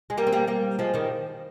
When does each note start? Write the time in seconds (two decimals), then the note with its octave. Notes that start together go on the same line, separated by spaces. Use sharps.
0.10 G#3
0.18 G3 A#3
0.27 C4
0.33 G3 A#3
0.47 G3 A#3
0.79 F3 G#3
0.94 D#3 G3